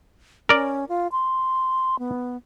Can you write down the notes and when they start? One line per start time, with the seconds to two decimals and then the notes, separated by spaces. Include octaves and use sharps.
0.49 C#4 A#4 D5
0.89 F4
1.12 C6
1.99 B3